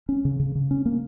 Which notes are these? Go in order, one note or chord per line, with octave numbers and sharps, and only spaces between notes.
C#4
C#3
C#3
C#3
C#4
A#3